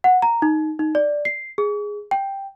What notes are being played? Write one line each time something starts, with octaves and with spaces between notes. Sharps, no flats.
F#5
A#5
D#4
D#4
D5
C7
G#4
G5